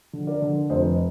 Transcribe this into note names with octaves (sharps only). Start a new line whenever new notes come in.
D3
A#4 D5
D3
F1 C5 D#5